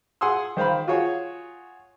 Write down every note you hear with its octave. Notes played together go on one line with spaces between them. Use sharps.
G#4 F#5 G#5 C6 D#6 E6
D#3 C5 F5 B5
F4 F#4 G#4 C#5